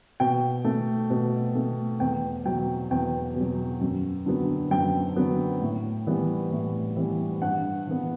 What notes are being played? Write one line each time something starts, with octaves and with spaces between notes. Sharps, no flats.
B2 G5
A3
B2
A3
E2 G5
B2 F#3 G5
E2 G5
B2 F#3
F#2
D3 F#3 B3
F#2 G5
D3 F#3 B3
A2
E3 G3 B3
A2
E3 G3 B3
G2 F#5
E3 B3